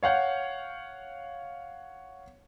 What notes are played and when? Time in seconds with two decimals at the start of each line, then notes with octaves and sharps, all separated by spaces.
0.03 C#5 F5 F#5 G6